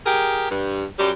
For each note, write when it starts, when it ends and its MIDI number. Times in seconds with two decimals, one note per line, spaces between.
0.06 0.47 67
0.06 0.47 68
0.06 0.47 70
0.51 0.85 43
0.99 1.12 42
0.99 1.12 55